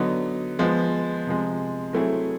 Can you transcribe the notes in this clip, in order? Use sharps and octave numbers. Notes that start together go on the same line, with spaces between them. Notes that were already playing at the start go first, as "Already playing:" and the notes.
Already playing: D3 F#3 B3 D#4
F3 G#3 B3
C3 F3 G#3
F#3 A3 C4 E4 G#4